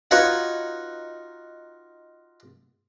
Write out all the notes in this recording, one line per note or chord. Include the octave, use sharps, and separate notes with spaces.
D#4 F4 F#4 B4 C#5 C#6